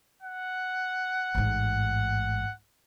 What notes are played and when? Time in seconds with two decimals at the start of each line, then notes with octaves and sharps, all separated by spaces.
0.22 F#5
1.35 A1 G#2